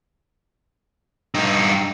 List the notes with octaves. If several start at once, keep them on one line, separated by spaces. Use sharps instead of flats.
G2 D#4